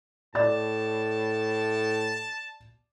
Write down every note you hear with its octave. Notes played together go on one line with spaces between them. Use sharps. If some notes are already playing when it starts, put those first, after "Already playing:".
A2 D5 A5 A6